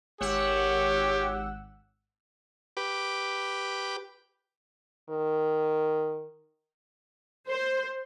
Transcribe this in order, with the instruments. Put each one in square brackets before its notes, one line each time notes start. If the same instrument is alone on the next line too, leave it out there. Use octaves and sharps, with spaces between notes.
[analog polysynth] G#1 F#5 E6 [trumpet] G4 [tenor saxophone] C#5
[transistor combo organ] G4 B4 D6
[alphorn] D#3
[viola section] C5